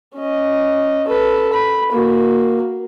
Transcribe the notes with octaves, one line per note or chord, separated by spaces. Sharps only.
C#4 D#5
A4 B4
B5
A#3 F#4